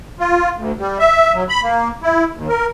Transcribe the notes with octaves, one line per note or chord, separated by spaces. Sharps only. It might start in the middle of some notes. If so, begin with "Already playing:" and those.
F4
D2
G3
E5
F#3
B5
A#3
E4
D#2
A#4